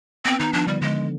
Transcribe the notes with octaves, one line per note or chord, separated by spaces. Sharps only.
B3 C4
D#3 D#4
F3 D4
D3 G3
D3 G#3